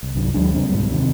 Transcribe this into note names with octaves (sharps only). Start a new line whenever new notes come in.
C2
C2 G2 D3 F#3
D#2 F#3 G#3 D4
C#3 E3 G3 C4
C2 G#2 B2 G3
E2 C3 D#3